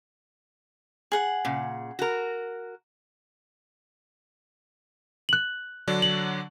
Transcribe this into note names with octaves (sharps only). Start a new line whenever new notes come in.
G#4 F#5
A#2 C#3
F#4 A#4
F#6 F#7
D3 F#3 D4
F#7